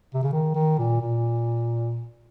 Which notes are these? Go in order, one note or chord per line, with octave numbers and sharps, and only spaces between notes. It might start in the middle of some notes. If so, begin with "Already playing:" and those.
C3
C#3
D#3
D#3
A#2
A#2